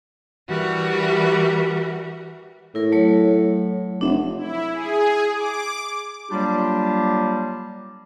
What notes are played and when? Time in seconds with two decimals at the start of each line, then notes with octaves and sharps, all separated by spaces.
0.49 E3 G3 F#4 A#4
2.75 A2 E4 A#4
2.92 F#3 A3 C#5
4.01 F1 D4 E5 F#5
4.38 E4
4.73 G#4
5.34 D6
6.30 F#3 G3 A#3 D4 F4 G4